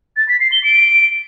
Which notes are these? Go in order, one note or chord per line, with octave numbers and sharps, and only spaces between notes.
A6
B6
C7
G7
D7